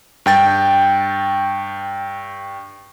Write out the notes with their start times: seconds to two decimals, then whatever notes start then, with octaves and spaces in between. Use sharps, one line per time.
0.26 G2 G5 A6